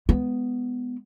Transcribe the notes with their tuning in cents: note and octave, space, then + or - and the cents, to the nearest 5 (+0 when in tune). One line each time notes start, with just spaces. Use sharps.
G#3 +0 B3 +5